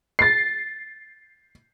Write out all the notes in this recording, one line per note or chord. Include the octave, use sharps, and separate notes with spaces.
A6 C7